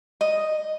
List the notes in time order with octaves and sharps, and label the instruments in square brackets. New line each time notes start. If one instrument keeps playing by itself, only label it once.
[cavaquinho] D#5